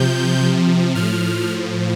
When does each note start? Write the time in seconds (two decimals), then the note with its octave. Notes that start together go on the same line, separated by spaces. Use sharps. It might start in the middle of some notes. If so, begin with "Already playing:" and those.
Already playing: C3 F3 G6
0.95 A2 F3 F6